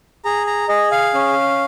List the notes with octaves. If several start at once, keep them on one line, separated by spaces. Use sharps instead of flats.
G#4 A#5
A#5
G#4 D#5
F5
C#4